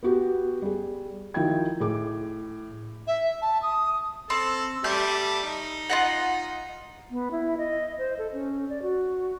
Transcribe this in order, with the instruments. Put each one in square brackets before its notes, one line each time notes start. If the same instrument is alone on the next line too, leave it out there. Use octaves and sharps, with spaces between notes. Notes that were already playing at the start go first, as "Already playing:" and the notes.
[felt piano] B3 F#4 G4
G3 G#4
D#3 F3 E4 F#4 G5 G#6
A2 G#4 D6
[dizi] E5
A5
D#6
[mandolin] C4 [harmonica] A4
[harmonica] G3 A3 A5 [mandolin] G6
[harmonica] D#4
[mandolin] F4 D#5 F#5
[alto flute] B3
E4
D#5
C5
A4
C#4
D5
F#4